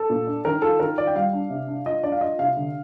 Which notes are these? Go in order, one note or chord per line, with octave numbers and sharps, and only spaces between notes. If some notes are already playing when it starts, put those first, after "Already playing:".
Already playing: A4
A#2
D4
D#3 A#4
F4 A4
D#3 A#4
F4 D5
G5
G3 F5
D4
C3
D4
F4 D#5
D4 D5
F5
F4 D#5
C3 F5
D3